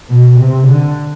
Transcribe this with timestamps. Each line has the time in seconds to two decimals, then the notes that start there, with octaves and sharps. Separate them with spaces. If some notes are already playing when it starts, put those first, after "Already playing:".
0.10 B2
0.39 C3
0.68 D3